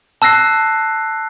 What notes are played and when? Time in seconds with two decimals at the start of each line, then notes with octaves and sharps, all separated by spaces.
0.22 A5 E6 F#6 A#6 C7